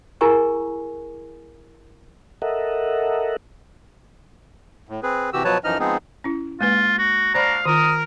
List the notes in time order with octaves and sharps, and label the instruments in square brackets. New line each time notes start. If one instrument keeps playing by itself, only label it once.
[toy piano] E4 G#4 A#4 G#5 A#5 C#6
[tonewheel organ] A4 A#4 D#5 E5 F#5
[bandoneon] A2
C4 G#4 B4
C3 E3 F#4 G4 E6
B2 F3 F#3 B4 C#5 A5
F#2 E3 F3 D#4 D#5 F6
F3 G#3 B3 C4 D#4 G#4
[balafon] C#4 E4
[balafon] G#3 A#3 B4 [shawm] F4
[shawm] F#4
[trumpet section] D4 F#4 F5 [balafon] C5 D5 B5 [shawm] A#5
[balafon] D#3 F4 [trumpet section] A#4 [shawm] D#6